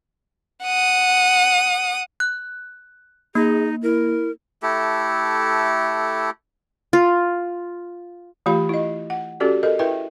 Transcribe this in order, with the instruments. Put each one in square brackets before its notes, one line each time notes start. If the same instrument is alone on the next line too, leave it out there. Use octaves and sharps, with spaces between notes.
[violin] F#5 D#6
[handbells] F#6
[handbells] A#3 [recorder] D#4 [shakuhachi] G#4
[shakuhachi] E4 [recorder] A#4
[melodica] A3 E4 G4 A4
[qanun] F4
[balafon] E3 A3 F4 G4 F5 B5
E4 D#5
F#5
C#4 F#4 G4 A4 D5
A4 A#4 D#5
E4 A#4 B4 E5 G5